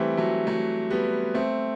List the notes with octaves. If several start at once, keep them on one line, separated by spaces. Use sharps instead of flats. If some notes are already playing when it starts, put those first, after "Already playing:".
Already playing: E3 G3 A3 C4
F#3 A3
F#3 A3
G3 B3
A3 C4